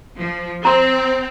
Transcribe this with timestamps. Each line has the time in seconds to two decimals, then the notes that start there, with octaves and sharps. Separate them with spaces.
0.17 F3
0.65 C4 A#5 C6